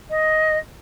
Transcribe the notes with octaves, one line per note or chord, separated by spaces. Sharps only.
D#5